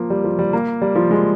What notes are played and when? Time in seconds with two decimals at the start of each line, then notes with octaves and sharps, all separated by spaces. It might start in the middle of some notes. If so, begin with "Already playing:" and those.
Already playing: F3 A#3
0.10 G3
0.24 F3
0.39 G3
0.53 A#3
0.82 G3
0.95 F3
1.11 G#3